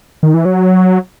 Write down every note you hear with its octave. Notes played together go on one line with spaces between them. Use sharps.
D#3
E3
F#3